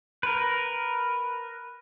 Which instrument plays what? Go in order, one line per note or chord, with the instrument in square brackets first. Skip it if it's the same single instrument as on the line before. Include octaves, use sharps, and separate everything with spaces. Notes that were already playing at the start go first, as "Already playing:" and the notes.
[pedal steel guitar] A#4 B4